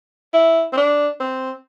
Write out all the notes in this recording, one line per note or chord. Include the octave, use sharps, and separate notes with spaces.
E4
C4
D4
C4